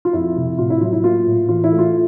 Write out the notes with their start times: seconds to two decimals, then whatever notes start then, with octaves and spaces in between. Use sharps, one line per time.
0.05 F4
0.13 F2 E4
0.36 C3
0.59 A2 F4
0.70 E4
0.81 F#3 F4
0.93 E4
1.04 A#3 F4
1.26 A2
1.49 E3 F4
1.64 E4
1.72 A3
1.79 F4